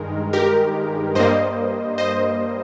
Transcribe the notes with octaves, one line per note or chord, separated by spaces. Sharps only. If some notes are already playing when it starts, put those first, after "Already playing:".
Already playing: G2 D#3 G#3 A#4
G4 A#4
G2 G3 A#3 C5 D#5
C5 D#5